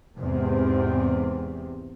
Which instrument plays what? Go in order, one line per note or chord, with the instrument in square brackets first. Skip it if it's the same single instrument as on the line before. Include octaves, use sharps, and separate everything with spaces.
[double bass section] E2 G#2 C3